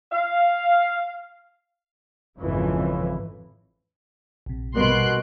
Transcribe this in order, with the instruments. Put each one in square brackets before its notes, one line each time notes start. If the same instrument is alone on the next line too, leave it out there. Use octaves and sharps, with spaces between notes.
[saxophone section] F5
[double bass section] G#1 F2 C#3 E3
[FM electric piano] A#1 C3
[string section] B2 [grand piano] G3 A#3 B3 [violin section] C6 F#6 D7